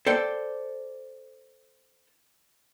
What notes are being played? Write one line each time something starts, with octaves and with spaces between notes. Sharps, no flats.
A4 C5 D5 G5